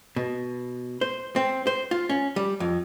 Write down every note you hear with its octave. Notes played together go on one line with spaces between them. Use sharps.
B2
C5
C4
C5
F4
C#4
G3
F2